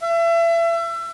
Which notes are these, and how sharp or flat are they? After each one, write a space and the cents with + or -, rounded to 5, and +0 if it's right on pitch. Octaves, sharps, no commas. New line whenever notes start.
E5 +30